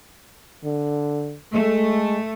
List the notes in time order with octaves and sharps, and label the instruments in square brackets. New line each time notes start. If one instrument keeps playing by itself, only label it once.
[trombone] D3
[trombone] G#3 [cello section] A3